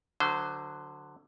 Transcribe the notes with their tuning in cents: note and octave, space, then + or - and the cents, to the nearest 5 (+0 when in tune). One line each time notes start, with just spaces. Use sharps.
D3 +15 F#3 +0 C5 -20